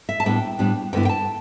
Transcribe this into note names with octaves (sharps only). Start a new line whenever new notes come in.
E5
A5
A2 G3 B3 D4 G5
A2 G3 B3 D4
G2 D3 B3 E4 G5
G5
A5